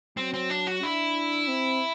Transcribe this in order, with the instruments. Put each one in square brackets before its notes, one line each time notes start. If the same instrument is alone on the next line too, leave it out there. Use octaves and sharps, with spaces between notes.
[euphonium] F#3 [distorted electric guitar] C4
[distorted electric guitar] C4
D4
F#4
[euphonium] D4 [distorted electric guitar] E4
[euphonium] C4